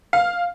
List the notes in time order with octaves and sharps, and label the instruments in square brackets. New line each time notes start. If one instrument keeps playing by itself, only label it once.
[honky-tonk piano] F5